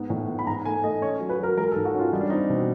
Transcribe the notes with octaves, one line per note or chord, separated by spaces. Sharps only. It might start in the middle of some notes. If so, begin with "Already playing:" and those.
Already playing: G#2 B3
A2
B3
B5
G#2 A#5
A3 G#5
A3 D#5
C#4 C#5
F#3
B4
F#3 A#4
G#3 A#4
A4
G#2
F#4
C#4 F4
G3 D#4
D4
C4 D#4
B2